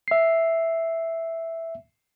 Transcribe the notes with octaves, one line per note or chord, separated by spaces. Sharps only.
E5 C7